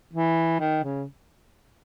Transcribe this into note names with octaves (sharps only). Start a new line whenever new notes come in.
E3
D#3
C#3